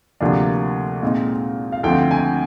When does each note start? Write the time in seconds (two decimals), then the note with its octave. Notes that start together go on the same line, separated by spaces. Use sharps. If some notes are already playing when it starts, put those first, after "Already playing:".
0.21 D2 C3 F3 A#3 D4
1.02 A#2 G#3 C4 D#4
1.72 F5
1.83 D2 D3 F3 C4 G5
2.11 G#5